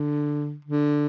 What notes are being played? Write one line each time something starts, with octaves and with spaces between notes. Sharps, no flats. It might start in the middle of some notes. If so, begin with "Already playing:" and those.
Already playing: D3
D3